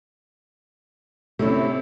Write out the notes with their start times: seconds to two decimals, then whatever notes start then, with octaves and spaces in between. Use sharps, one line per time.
1.39 C3 A3 C4 C#4 E4